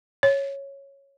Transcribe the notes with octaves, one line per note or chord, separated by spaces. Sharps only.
C#5